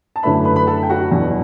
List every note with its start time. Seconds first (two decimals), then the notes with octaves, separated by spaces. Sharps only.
0.16 A5
0.23 F#2 D3 A3 E4 B4 B5
0.45 B4 B5
0.56 B4 B5
0.67 A4 A5
0.83 G5
0.89 F#4 F#5
1.11 E2 B2 F#3